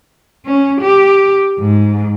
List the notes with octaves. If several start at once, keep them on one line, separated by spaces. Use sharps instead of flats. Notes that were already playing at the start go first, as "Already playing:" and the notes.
C#4
G4
G#2